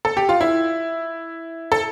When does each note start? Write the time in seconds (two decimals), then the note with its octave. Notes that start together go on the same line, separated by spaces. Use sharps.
0.05 A4
0.17 G4
0.29 F4
0.41 E4
1.72 A4